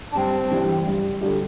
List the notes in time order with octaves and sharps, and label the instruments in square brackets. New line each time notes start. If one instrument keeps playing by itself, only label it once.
[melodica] D4
[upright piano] G2 [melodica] C4
[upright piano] E3 G3 D4
G2
D3 G3 D4 G4